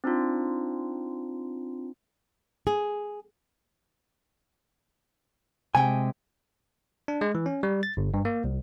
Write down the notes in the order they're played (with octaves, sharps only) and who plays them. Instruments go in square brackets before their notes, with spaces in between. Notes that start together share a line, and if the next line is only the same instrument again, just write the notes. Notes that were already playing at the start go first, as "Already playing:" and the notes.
[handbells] C4 D4 D#4 F4
[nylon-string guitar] G#4
[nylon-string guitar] C3 G#3 G5 [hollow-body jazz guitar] G#5
[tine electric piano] D4
G#3
E3
C#4
G3
A6
G1
G2
A#3
C2